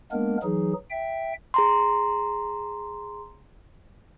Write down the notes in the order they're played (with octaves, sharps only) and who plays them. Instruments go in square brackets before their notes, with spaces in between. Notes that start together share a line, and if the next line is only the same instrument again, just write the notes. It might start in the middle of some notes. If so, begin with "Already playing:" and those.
[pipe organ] G#3 A#3 B3 D4 A#4
E3 F#3 D#4 G#4
E5 G5
[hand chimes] G#4 A#5 C6